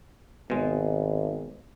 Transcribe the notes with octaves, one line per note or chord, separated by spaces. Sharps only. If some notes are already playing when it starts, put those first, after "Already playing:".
G#1 B2 G#3